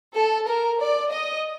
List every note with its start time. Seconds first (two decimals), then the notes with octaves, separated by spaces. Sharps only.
0.14 A4
0.47 A#4
0.80 D5
1.12 D#5